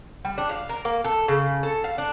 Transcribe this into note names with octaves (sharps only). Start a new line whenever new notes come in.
G3
D4
F5
A#4
A#3
A4
C#3
A4
F5
D4